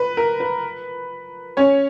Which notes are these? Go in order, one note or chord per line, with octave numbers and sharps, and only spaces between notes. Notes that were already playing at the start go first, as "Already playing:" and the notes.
Already playing: B4
A#4
B4
C#4 C#5